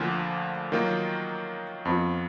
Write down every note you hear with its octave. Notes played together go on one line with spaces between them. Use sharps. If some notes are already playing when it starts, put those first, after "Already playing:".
Already playing: D2 D3 F3 A#3 F4
D#3 F#3 A#3 F4
F2 F3 B3 F4